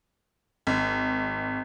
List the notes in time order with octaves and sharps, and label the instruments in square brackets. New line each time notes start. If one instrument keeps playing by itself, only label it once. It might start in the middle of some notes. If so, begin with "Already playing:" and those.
[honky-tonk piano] G#1